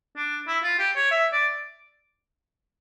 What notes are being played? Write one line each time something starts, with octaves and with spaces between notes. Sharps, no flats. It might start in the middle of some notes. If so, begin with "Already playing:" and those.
D4
E4
F4
G4
C#5
E5
D5